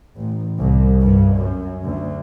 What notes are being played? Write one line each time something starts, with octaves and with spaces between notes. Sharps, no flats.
A1
C2
G2
F#2
D2